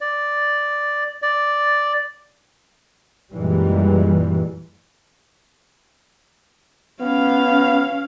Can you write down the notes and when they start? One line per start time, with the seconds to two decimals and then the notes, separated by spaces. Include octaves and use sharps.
0.01 D5
1.22 D5
3.33 F#2 A#2 E3 G3 G#3
7.01 B3 C#4 F5